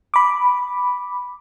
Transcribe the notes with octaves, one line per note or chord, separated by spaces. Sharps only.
B5 D6